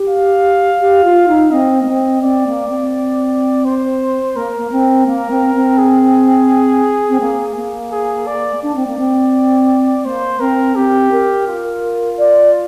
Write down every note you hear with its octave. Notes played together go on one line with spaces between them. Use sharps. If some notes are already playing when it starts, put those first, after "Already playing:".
Already playing: G4
F5
G4
F4
D#4
C4 D#5
A#3
C4
C4 D5
A#3
C4
C5
A#3 A#4
A#3
C4
A#3
C4
C4
G#4
C4
A#3
A#3
G#4
D5
D4 D5
C4
A#3
C4
A#3 C5
C4 A#4
C4 G4
A#4
F4
D5